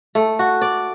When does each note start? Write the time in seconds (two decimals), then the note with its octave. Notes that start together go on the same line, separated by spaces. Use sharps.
0.15 A3
0.39 F#4
0.62 D5